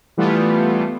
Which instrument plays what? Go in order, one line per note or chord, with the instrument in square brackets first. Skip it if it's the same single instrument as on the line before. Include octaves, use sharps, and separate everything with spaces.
[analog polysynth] E3 G3 A3 B3 F4